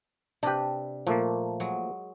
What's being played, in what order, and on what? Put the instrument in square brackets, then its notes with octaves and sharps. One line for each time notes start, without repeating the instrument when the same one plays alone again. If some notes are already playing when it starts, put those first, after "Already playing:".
[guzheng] C3 B4 [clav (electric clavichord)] D4 G4
[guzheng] A#2 [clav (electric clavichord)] F3 A3 A#3
[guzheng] F#3 G#3